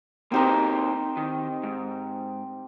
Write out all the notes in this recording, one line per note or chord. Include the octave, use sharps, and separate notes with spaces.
A#3 C4 D#4 G4 A#4 C5
D#3
G#2